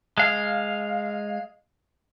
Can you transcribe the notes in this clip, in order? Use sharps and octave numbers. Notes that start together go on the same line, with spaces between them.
G#3 F5